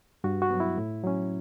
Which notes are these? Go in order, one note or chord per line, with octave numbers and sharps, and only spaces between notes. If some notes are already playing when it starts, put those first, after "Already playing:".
G2 F#4
F#4
F#3 B3
E4
A2
F#3 C#4